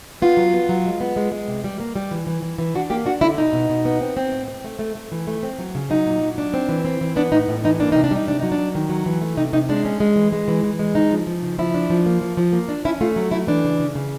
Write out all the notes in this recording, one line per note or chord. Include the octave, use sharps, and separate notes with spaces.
B3 F4
F#3
B3
F#3
G#3
B3
G#3
G#3
C3
G3
A#3
G3
E3
E3
E3
E3
D4 F#4
A#3 G4
D4 F#4
D3 E4
B2 D#4
B2
B2
B3
C4
C4
A2
C4
A3
A3
A3
E3
A3
C4
F#3
C#3
F#3 D#4
A#2
F#3
D4
C4
E3
C4
E3
B3 D4
A2 D#4
A2
E3 D#4
A#3 D4
C3 D#4
D4
G3 D#4
C3 D4
F#3 D#4
D4
F#3
D#3
F#3
E3
A3
C3 D#4
C3 D#4
G#3 D4
C#4
G#3
E3
G#3
E3
E3
G#3
C#3 D#4
F3
F3
C#3
F3 E4
D4
F3
A#3
F3
F3
A#3
D4
C#4 E4
A3 F4
F#3
A3 E4
E3 D4
C#3
C#3
C#3